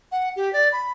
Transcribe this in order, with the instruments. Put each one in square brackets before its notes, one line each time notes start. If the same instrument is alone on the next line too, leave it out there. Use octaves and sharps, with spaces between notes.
[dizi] F#5
G4
D5
B5